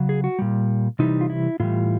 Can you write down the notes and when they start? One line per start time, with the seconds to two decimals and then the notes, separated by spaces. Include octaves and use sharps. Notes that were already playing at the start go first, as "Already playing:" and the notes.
Already playing: C#3 F#3
0.09 G#4
0.24 F#4
0.39 A#2 G3
0.99 C3 E3 G3 D#4
1.21 F4
1.30 E4
1.60 A2 E3 G3 F4